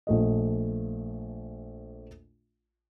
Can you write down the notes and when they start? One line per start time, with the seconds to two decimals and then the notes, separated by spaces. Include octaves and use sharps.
0.07 A#1 A3 D#5